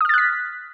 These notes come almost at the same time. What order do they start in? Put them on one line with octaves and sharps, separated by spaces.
D#6 F6 A6 F#6 B6